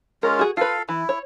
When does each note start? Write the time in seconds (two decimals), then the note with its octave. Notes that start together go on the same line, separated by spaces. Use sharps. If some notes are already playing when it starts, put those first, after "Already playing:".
0.23 G#3 C#4 F4 A#4
0.39 F#4 G#4
0.57 F4 A4 B4 F5
0.89 E3 E4
1.09 C#5